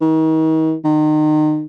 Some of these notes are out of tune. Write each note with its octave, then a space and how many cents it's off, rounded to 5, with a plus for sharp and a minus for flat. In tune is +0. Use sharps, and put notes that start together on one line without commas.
D#3 +40
D#3 -30